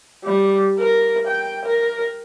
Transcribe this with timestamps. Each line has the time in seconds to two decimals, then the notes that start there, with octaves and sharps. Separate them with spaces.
0.24 G3
0.79 A#4
1.27 G5
1.65 A#4